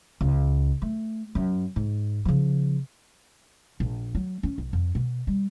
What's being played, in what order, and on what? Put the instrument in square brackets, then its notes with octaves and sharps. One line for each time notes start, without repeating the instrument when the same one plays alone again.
[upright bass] C#2
A3
F#2
G#2
C#3 F3
A#1
F#3
C#4
B1
F2
B2
G3